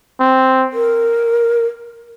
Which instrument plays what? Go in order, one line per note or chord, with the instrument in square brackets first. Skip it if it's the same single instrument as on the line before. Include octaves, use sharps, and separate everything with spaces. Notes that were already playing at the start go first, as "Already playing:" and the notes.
[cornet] C4
[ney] A#4